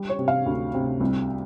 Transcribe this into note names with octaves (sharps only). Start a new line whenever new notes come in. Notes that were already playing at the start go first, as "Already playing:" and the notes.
Already playing: G3
C#5
C3
F5
D2
C3
C2